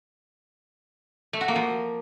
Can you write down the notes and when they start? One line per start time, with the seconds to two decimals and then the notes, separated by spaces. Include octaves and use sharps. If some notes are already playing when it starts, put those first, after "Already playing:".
1.33 A3
1.41 F#4
1.48 A#3
1.56 F3